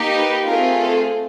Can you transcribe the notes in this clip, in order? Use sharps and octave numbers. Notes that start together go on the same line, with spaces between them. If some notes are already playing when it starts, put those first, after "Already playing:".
Already playing: A#3 D#4 G4
B4
A3 C4 F4 G#4 A#4
A4